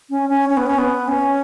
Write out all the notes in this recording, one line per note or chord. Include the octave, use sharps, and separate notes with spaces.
C#4
C#4
C#4
B3
C#4
B3
C#4